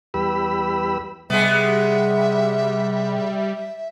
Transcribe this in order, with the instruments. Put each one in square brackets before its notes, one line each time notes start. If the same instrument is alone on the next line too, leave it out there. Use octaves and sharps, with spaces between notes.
[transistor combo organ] E2 G3 G4 B4 B5 E6
[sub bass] C3 [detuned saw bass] G3 [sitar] G#3 B3 [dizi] E5